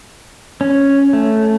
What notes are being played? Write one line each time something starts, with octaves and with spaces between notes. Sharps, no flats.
C#4
A3